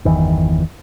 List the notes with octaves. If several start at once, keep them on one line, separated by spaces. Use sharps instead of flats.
G1 E2 D#3 E3